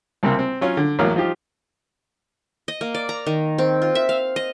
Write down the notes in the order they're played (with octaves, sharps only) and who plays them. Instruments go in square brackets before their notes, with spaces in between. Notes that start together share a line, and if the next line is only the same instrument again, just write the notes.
[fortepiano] C#2 C3 G3 A#3 C4
C4
F#3 C#4 F4
D3
A1 E2 F#3 A#3 A#4 F5
F3 D#4 F4 G4
[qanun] D#5
A#3
D5
A#5
D#3
C4
F4
E5
F5
D#5